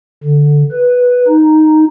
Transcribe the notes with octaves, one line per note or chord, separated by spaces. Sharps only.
D3
B4
D#4